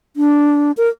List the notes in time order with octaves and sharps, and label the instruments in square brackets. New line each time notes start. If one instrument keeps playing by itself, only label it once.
[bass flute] D4
A#4